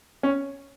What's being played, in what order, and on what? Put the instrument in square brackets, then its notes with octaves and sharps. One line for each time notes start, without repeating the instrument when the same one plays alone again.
[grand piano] C#4